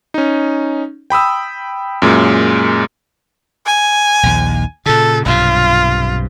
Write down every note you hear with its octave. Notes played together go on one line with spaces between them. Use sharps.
C#4 D#4
G5 B5 D#6 E6
F#2 A#2 G#3
G#5
A#1 D#2
A#2 C#3 A4
B1 G2 C3 F4